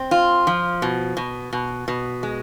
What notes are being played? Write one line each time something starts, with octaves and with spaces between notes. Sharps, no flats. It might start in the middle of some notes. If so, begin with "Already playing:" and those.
Already playing: C4
F4
F3
B2
B2
B2
B2
G#3